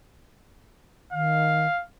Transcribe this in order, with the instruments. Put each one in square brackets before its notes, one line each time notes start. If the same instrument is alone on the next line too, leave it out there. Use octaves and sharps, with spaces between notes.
[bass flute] D#3 [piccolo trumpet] F5